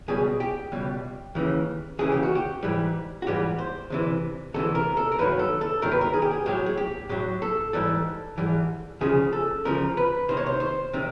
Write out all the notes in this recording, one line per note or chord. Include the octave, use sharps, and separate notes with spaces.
C#2 B2 G3 G#4
G4
C#2 B2 G3
D#2 C#3 E3
D#2 C#3 E3 G#4
G4
F#4
G4
G#2 E3 G3
F#4
G#2 E3 G3 G4
C5
D2 C3 E3
D2 C3 E3 A4
A#4
A4
A#4
G2 D#3 F#3 B4
A4
A4
G2 D#3 F#3 A#4
B4
A#4
G#4
G4
G#4
A2 F#3 G4
G#4
G4
A2 F#3 G4
A4
G#2 E3 G3 A4
G#2 E3 G3
D2 C#3 F3 G#4
A4
D2 C#3 F3 A#4
B4
C2 C3 D#3 C5
C#5
C5
C5
C3 D#3